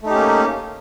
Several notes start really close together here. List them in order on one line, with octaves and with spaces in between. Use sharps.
A3 D#4 G4 C#4 A#3